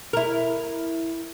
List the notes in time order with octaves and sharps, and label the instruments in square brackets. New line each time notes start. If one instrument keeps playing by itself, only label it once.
[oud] E4 A#4